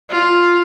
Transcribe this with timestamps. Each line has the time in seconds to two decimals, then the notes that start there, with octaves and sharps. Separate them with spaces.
0.10 F4